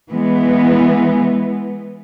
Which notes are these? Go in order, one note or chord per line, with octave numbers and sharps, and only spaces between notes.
E3 G#3 B3